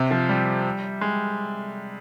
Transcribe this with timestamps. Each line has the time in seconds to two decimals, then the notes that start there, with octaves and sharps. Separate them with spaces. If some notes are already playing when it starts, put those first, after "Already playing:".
Already playing: C3
0.11 F3
0.29 G3
1.01 G#3